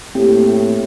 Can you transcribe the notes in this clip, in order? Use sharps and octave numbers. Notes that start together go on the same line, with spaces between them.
A2 A#3 C4 G4